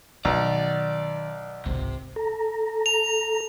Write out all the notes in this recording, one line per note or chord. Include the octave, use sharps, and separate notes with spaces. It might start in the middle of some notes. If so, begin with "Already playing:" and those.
B1 D#3 D5
G#1 C#2 C3
A4 A#5
F7